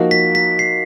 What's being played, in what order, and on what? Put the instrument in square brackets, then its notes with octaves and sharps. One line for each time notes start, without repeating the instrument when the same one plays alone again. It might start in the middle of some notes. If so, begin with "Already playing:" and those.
Already playing: [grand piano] F3 A#3 D#4 F#4
[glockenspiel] B6
B6
C7